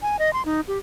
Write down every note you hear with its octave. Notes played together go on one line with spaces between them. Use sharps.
G#5
D#5
C6
D#4
G4